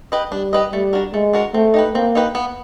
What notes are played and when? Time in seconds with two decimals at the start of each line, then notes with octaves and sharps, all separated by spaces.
0.12 G4 B4 D#5
0.32 G3 D4
0.53 G4 B4 D#5
0.73 G3 A3
0.93 D4 F#4 A#4
1.13 G#3 A3
1.33 D4 F#4 A#4
1.54 A3 C4
1.74 D#4 G4 B4
1.95 A#3 C4
2.15 D#4 G4 B4
2.35 B3